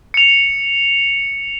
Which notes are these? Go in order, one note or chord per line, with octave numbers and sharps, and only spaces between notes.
C#7 F7